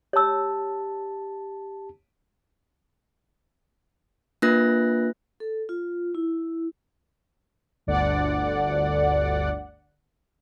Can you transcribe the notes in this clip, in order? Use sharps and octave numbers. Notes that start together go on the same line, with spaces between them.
G4 C#5 A5 E6
A#3 D4 F4 B4 F#6 A#6
A4
F4
E4
G1 D2 D3 D5 F#5